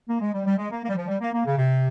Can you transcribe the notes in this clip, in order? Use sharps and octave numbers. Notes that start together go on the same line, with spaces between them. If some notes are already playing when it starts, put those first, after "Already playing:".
A#3
G#3
G3
G3
G#3
A#3
A#3
G3
F3
G3
A#3
A#3
C#3
C3